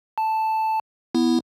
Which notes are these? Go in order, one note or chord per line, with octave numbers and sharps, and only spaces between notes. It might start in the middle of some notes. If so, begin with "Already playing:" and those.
A5
B3 E4